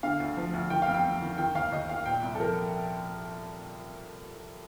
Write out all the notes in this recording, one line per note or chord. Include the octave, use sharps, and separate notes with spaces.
D3 F5
D2
F3
D2
D#3 G5
F5
F2
G5
F2
D#3
D#3 G5
D#2 F5
D#2 D#5
D#3 F5
A#2 G5
C2
A4
F3 A#4